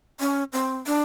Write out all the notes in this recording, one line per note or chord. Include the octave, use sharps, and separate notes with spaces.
C#4
C4
D4